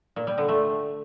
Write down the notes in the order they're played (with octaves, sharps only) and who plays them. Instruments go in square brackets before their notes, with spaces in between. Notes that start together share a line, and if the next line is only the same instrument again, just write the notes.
[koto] A#2
G3
D3
A3